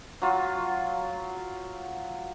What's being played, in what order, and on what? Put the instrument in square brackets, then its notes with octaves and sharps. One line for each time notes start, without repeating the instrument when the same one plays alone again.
[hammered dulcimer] F#3 F4